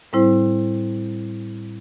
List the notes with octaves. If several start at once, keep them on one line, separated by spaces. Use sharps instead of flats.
A2 G3 C4 E4 C5